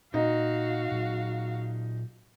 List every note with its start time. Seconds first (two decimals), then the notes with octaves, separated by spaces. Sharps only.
0.14 A#2 D#4 F#4 F5
0.91 A#2 F#3